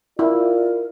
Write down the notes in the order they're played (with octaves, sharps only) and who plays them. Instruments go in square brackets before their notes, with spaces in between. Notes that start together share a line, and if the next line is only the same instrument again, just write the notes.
[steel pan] E4 [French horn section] F4 D5 [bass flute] A#4